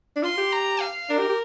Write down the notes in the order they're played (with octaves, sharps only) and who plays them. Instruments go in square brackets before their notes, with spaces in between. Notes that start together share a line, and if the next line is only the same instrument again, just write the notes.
[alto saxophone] D4
[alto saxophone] F4 [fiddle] C6
[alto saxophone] G4
[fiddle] A#5
F5
[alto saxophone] D4 [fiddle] A#4
[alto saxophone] G4
G4